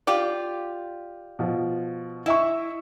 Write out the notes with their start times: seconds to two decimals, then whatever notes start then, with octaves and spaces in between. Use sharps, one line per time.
0.07 F4 G4 D5
1.39 B2 F3
2.26 E4 D#5 E5 C#6